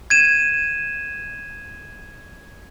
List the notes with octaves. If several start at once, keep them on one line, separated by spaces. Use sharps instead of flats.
G#6 D#7 E7